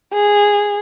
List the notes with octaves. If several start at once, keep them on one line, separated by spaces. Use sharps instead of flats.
G#4